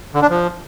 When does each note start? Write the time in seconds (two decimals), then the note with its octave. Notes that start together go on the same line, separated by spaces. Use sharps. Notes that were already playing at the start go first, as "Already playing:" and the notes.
0.14 D3
0.22 D4
0.29 F3